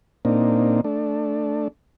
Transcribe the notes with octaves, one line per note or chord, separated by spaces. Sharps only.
A#2 A#3 C4 D4 D#4
A3 D4